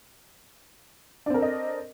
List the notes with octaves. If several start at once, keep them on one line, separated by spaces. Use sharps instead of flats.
C4 D4 A4 A#4 D#5